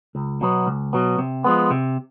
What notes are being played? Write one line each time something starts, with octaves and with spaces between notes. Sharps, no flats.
C#2
B2 F#3 B3
C#2
B2 F#3 B3
C3
F3 G#3 B3
C3